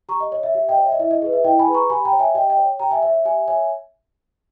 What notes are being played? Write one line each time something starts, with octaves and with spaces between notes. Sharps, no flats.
G4 A#5 C#6
D#5
C#5 D#5
E5
G4 E5
D#5 G5
C#5
E5
D#5
E4 E5
D#5
G#4 B4 D#5
E5
E4 D#5 G5
G#5 B5
G#4 B4
A#5 C#6
G4 G#5 B5
G5 A#5
C#5
E5 G#5
G4 D#5 G5
D#5 G5
C#5
G4 G5 A#5
E5 G#5
C#5 E5
E5
G4 E5 G#5
C#5 E5 G#5